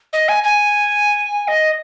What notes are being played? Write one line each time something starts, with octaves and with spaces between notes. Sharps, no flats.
D#5
G#5
G#5
D#5